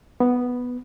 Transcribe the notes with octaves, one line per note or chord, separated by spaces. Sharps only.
B3